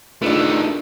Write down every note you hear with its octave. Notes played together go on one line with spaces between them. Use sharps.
D#3 A3 D4 F4 G#4 B4 D5